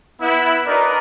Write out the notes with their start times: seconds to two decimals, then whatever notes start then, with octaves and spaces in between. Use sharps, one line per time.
0.20 B3 E4
0.66 D4 D#4 F#4 A#4 B4 D5